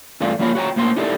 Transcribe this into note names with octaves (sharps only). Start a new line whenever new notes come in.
E2 G2 A3 F4 D5
F3 A#3 F4 C#5 B5
F#4 C#5 G5 A#5
A2 A#3 C5 C6
D#4 E4 G4 A4 B4 D5